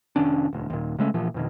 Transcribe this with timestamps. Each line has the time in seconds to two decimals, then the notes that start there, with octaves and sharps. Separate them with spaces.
0.16 F1 D#3 C#4 D4
0.53 E1 D2
0.70 D#2 A#2
0.99 C#3 G#3 A3 C#4
1.14 A#2 E3 F3
1.34 F2 B2 D#3